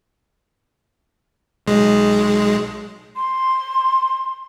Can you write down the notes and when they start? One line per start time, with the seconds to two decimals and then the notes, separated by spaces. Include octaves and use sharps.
1.67 B1 G#3
3.16 C6